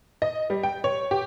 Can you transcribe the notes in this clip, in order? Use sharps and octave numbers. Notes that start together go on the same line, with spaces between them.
D#5
G3
G5
C#5
G4